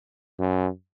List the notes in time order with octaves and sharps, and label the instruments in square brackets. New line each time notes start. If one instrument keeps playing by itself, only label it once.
[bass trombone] F#2